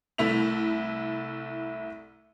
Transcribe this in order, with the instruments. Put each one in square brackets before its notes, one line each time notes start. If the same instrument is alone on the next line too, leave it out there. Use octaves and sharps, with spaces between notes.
[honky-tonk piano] C2 A3 E4 B6 F7